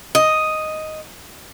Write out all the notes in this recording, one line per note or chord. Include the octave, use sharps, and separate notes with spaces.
D#5